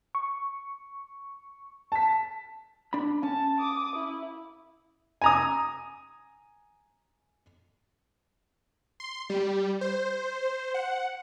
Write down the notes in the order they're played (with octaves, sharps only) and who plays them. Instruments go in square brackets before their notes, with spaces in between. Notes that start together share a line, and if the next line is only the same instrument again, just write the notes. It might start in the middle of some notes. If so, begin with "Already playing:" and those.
[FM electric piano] C#6
[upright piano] A5 B6
[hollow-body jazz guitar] D4 B5
[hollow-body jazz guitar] C#4 [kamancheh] A5
[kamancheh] D6 D#6
E4
[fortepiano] G#5 A#5 D#6
[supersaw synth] C6
G3
C5
F#5